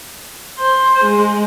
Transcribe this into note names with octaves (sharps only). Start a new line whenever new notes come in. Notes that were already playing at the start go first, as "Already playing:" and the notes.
C5
G#3